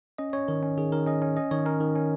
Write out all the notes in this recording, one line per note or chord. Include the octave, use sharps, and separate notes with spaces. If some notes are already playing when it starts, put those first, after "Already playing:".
C#4 D#5
C#4 C#5
D#3 A#4
C#4
D#3 G#4
D#3 A#4
C#4 D#5
C#4
C#4 D#5
D#3 C#5
C#4 A#4
D#3
C#4